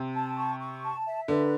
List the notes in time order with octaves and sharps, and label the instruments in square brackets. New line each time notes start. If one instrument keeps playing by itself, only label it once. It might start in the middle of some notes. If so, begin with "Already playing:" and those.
Already playing: [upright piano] C3
[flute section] A5
C#6
C#6
A5
E5
[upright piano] D3 [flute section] B4